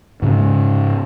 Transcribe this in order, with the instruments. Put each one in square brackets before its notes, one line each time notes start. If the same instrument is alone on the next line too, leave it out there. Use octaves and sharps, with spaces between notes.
[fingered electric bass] G#2 C#3 C4 C#4